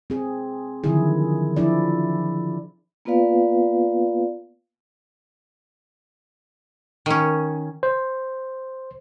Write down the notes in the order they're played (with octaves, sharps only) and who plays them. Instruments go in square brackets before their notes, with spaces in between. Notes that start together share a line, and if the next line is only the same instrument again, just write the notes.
[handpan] C4 G#4
D3 D#3 F3 F#3 E4 G#4
F3 D4 E4 D5
[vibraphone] A#3 B3 F4 B4 D5 F5
[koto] D#3 C#4
[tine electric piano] C5